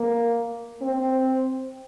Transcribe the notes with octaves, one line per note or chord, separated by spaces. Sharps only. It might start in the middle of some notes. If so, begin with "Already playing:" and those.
Already playing: A#3
C4